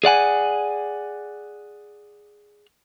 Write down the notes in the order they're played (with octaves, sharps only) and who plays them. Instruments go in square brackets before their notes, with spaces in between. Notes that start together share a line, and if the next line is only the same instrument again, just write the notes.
[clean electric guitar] G#4 D5 F#5 G#5